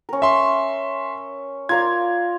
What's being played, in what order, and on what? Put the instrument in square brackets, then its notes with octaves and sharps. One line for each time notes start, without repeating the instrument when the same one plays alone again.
[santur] C#4 A#4
[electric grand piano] E5 C6
[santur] F4 A#4 D5 [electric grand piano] G#6